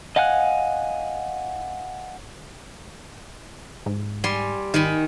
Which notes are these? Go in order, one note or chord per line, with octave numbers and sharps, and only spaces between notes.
D#5 F5 F#5 G#5 F#6
G#2
G3 G#5 C6
G#1 D#3 G#5 B5